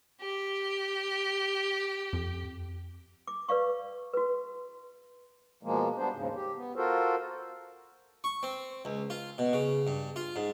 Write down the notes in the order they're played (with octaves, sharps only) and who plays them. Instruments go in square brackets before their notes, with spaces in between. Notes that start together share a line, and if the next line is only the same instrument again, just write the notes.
[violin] G4
[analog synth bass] F2
[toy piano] D6
B4 D5 F5 C#6
F#4 B4
[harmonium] B2 F3 G#3 A#3
G3 B3 D4 C5
D#2 G#2 C#3
G4
B3
F4 F#4 A4 A#4 C5
[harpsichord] C#6
C4
C#2
F4
B2
C#3
G2
F4
G#2